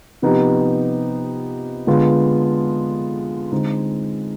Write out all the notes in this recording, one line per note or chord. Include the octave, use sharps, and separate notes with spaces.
C3 F3 B3 D#4 G4
D3 G#3 B3 F4
D3 G#3 C4 D#4